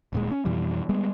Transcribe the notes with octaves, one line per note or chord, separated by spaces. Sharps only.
D#1 A#2 G#3
C#4
F2 B2 E3 G3
G3 G#3 B3